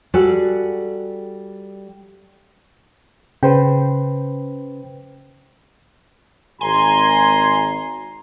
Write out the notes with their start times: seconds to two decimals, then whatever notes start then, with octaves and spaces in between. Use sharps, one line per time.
0.14 G3 F#4 G#4 A4 D5
3.43 C#3 B4 C5 G5
6.61 G#1 G#5 A#5 C6